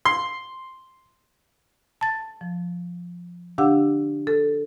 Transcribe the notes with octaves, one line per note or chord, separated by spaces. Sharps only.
C6
A5 A6
F3
D3 D4 G4 F5 F#5 E6
A4